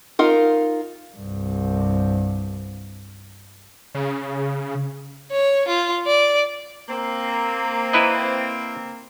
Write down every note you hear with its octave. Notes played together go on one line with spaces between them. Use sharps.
D#4 F4 A#4
C2 G2
C#3
C#5
F4
D5
A#3 C4
E4 B4 D#5